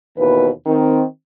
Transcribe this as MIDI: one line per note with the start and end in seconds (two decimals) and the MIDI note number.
0.18 0.49 39
0.18 0.49 47
0.18 0.49 52
0.18 0.49 71
0.66 1.02 51
0.66 1.02 60